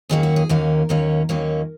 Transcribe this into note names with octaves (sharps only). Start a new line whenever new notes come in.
D#2 D#3 F#3 A#3 C#4 G#4
F#4
G#4
D#2 D#3 F#3 A#3 C#4 A#4
D#2 D#3 F#3 A#3 C#4
D#2 D#3 F#3 A#3 C#4